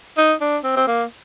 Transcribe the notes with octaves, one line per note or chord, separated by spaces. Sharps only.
D#4
D4
C4
C4
A#3